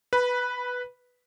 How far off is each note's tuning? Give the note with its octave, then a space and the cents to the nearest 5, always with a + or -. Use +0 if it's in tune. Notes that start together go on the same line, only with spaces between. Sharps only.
B4 +0 B5 -20